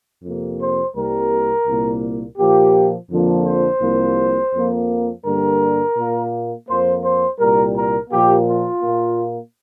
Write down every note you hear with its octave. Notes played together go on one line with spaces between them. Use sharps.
F2 C3 A#3
C5
C2 C3 G3 A#3 A#4
C2 A#2 A#3
A#2 F3 A#3 G4
F2 D3 F3 A#3
C5
C2 C3 F3 A#3
F2 F3 A#3
G2 D3 G3 A#3 A#4
A#2 A#3
F2 F3 A#3 C5
C5
C2 A#2 G3 A#4
A#4
A#2 F3 A#3 G4
F4
A#2 A#3